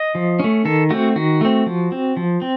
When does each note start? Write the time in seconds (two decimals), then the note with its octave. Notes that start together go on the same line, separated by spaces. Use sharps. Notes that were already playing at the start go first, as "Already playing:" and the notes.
Already playing: D#5
0.15 F3
0.39 A3 C#4
0.65 D#3 A4
0.90 A3 C4 F#4
1.16 D#3 F#4
1.41 A3 C4
1.66 F3
1.92 C4
2.17 F3
2.42 C4